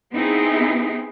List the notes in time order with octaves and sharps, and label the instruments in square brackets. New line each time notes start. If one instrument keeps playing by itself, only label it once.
[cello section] B3 C4 D#4 E4 G#4